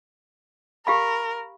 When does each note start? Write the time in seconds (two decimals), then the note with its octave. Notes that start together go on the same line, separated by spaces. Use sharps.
0.87 G4 A#4 F5 B5